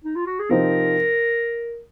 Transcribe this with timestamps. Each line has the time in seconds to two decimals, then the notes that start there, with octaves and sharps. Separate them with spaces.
0.04 D#4
0.16 F4
0.26 F#4
0.39 G#4
0.49 C3 F3 C4 D#4 A#4